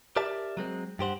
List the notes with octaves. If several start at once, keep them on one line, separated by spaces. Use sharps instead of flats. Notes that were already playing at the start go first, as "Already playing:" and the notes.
G4 A#4 D5 E5 A5
F#3 G#3 C4
G2 G4 C5 F#5